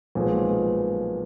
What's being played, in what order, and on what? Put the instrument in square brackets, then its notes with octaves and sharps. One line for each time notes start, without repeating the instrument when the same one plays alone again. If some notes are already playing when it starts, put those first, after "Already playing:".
[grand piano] B1 A#2 F3 G#3 B3